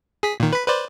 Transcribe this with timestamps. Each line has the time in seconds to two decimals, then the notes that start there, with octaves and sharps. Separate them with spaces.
0.23 G#4 B6
0.40 A#2 D#3
0.53 B4 B5
0.68 B4 C5 D5